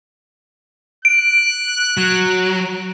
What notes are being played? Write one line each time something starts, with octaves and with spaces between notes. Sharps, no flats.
F#6 D7
F#3